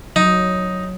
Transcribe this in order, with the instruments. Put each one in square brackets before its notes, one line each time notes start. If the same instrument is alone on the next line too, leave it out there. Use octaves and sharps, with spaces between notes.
[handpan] F#3 [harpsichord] D#4